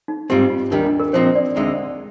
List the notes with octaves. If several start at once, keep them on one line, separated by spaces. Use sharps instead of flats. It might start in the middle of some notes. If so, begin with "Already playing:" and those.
D#4
G#2 G3 C4 F4 G4
F4
D#2 D#3 G3 D4
D4
A#4
A#2 F3 C4 D#4 C5
D5
D2 D3 G#3 C4 D#4